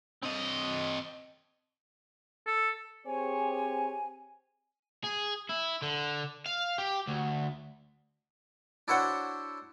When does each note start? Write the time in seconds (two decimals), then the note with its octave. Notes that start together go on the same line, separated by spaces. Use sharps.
0.23 C4 D#5
2.47 A4
3.07 C4 G4 G#4 C5 C#5 G#5
5.04 G#4
5.49 E4
5.82 D3
6.46 F5
6.78 G4
7.07 D2
8.88 D4 E4 F#4 C5 C#5 F#5